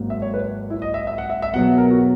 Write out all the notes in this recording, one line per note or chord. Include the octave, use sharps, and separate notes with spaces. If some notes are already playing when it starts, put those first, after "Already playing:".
Already playing: G#1 G#2 F#3 A#3
E5
C#5
B4
E4
D#5
E5
E5
F#5
E5
E5
E2 B2 F#3 B3 F#5
A#4
F#4